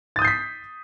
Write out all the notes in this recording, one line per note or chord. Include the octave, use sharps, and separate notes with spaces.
D#6 G6 A6 B6 C7